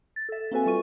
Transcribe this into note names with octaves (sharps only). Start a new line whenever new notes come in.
A6
A4 E5
A#3 C4 F#4 A4 B4 G#5
G3 F4 C#6 D#7